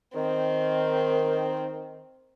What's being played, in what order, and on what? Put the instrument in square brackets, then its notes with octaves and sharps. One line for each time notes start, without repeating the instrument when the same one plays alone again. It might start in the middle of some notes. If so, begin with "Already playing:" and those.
[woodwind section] D#3 [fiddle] C4